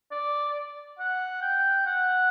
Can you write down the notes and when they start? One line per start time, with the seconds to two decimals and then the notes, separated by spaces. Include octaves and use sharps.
0.11 D5
0.99 F#5
1.42 G5
1.86 F#5